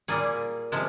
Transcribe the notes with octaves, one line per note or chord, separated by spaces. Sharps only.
A#2 G3 A#3 G#4
C3 F3 G#3